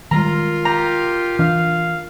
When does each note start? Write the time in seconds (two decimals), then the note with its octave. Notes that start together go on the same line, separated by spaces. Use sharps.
0.11 D#3 G3 G#3 F4 A#4 A#5
0.65 G4 A#5
1.39 E3 D4 F5